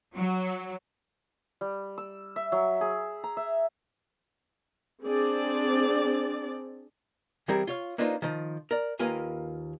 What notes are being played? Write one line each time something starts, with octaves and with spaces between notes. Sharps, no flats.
F#3
G3
E6
E5
F#3
G#4
A#5
E5
C4 D4 G#4 D5
E3 G3 C4 G#4 A#4
F4 C#5 F5
A#3 D4 D#4 F4 B4 C5
D#3 F3
A#4 D5
D#2 A#3 F4 A#4 B4 G#5